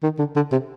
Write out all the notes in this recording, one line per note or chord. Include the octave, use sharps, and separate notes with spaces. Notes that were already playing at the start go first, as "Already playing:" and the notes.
D#3
D3
D3
C3